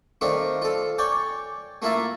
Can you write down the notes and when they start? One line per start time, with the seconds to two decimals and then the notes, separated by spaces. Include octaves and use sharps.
0.21 D#3 A3 C4 D4 F4
0.62 F4 A4
0.98 C#5 D5 G5 G#5 D6
1.82 A3 A#3 E4 F4 E5 A5